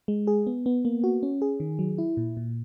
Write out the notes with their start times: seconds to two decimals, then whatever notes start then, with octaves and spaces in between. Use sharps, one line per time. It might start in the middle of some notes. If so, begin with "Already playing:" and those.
0.08 G#3
0.27 G#4
0.47 B3
0.66 B3
0.85 A#3
1.04 F#4
1.23 C#4
1.42 G#4
1.60 D#3
1.79 F#3
1.98 E4
2.17 A#2
2.37 A#2